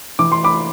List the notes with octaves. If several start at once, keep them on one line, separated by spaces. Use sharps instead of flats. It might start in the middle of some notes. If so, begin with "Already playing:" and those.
E3 D6
C6
B5 D6